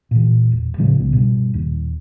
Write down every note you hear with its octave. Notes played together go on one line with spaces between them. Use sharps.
A#2 E3
E1
A2 C#3 F3 G#3
C2 C#3 B3
G2 B2
D#1 D#2